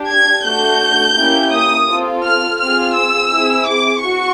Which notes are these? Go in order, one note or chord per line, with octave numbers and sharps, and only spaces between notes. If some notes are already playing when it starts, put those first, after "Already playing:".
Already playing: D4 G4
G#6
A3 D4 F#4 G6
A#3 C#4 E4 G4
D#6
C4 F4 A4
F6
C4 F4 G#4 F6
E6
C4 E4 G#4
D6
F#4 C#6